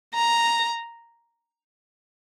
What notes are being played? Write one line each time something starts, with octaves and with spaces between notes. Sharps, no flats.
A#5